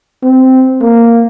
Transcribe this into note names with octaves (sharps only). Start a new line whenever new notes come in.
C4
A#3